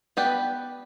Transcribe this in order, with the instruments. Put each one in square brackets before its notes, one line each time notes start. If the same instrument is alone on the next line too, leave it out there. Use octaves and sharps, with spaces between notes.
[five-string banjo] B3 G4 B4 D5